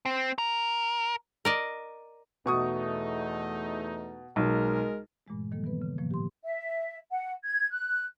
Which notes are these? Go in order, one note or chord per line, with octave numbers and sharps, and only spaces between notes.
C4
A#4
A#4 D5 D#5
E2 B2 A3 D#4 C#6 D#6
B1 G#3 A#4
G2 A#2 E3 G#3 A3
D#3 F3 G3 A#3 A4
E3 G3 B3 B4
C#3
A2 D#3 F3 A3 A#3
G4 C6
E5
F#5
G#6
F#6